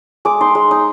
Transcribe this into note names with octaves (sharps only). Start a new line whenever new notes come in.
G#3 D6
D#4 C6
G#3
D#4